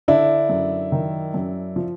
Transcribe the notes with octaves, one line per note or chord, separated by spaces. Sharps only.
D3 D4 E4
F#2
D#3
F#2
F3